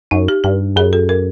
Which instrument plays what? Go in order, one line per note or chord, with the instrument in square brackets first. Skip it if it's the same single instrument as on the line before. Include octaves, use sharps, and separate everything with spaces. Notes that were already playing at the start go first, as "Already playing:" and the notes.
[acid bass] F#2 [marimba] D#4
[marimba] G4
[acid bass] G2 [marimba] G4
[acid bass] F#2 [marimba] G#4
[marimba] A4
A#4